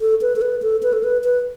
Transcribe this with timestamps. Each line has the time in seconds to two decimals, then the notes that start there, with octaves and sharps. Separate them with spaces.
0.01 A4
0.22 B4
0.36 A4
0.41 B4
0.62 A4
0.83 B4
0.93 A4
1.03 B4
1.24 B4